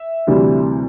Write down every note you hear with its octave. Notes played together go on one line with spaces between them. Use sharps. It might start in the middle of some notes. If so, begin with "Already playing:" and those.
Already playing: E5
D2 C3 E3 G3